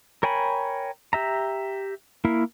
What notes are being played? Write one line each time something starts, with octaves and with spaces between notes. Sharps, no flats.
A#4 C#5 G5 G#5 B5
G4 E5 A#5
A#3 E4 A#4